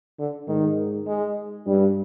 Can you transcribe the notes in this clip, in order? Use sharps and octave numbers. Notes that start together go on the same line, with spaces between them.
D3
G#2 D#3
G#3
G2 G3